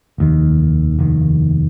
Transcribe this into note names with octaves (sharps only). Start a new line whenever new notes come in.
F1 D#2 D#3
F1 D#2 D#3